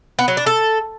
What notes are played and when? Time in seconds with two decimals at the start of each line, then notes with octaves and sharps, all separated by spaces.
0.19 B3
0.28 F#3
0.37 D4
0.46 A4